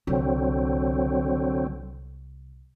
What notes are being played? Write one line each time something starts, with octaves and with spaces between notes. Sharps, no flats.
C2 D3 F#3 C4